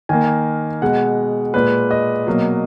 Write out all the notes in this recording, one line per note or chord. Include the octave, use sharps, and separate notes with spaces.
D#3 A#3 G#5
B2 G#3 F#5
A#2 G#3 B4
D#5
B2 F#3 A#3